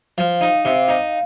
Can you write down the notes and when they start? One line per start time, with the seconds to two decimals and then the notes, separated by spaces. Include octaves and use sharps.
0.18 F3 F5
0.41 D#4
0.65 C3
0.88 D#4